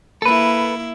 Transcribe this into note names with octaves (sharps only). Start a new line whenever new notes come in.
A#3 E4 A4 B4